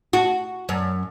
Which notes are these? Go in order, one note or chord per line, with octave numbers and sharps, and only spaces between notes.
F#4
F#2